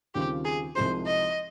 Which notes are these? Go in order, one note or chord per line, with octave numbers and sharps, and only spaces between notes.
D#2 C#3 G3 C4 F4 G4
G#4
C2 C3 F3 G#3 D#4 C5
D#5